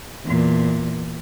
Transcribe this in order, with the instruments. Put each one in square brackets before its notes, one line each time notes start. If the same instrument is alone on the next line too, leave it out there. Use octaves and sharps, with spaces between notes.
[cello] E2 A#2